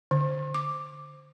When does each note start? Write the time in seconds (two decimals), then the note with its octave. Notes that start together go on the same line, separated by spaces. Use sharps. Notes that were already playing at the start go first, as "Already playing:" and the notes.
0.11 D3
0.54 D6